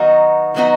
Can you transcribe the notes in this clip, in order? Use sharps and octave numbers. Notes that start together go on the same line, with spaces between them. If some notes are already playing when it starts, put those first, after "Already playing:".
Already playing: D#3 F#3 B3 D#4 F#4
D#3 F#3 B3 D#4 F#4